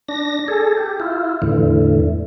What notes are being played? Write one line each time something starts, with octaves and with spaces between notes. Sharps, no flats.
D4 A#6
G#4 A4
G4
E4 F4
E2 A2 D3 E3